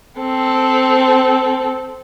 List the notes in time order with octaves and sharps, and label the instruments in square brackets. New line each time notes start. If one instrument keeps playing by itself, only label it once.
[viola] C4 A4